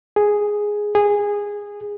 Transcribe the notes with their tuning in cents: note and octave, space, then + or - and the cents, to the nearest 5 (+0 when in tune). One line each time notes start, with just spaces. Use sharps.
G#4 +0
G#4 -15